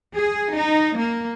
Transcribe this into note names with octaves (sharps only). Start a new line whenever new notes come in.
G#4
D#4
A#3